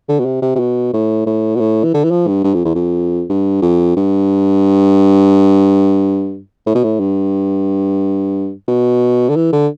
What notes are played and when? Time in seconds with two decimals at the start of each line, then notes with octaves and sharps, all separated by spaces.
0.09 D3
0.20 B2
0.26 C3
0.42 C3
0.56 C3
0.59 B2
0.93 A2
1.26 A2
1.56 B2
1.60 A2
1.84 E3
1.94 D3
2.04 E3
2.11 F3
2.28 G2
2.44 G2
2.54 F2
2.65 E2
2.75 F2
3.30 G2
3.62 F2
3.97 G2
6.67 A2
6.75 B2
6.84 A2
7.00 G2
8.68 B2
9.30 D3
9.36 E3
9.53 D3